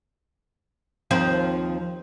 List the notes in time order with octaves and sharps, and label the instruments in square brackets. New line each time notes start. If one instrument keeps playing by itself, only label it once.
[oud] D#2 F3 C4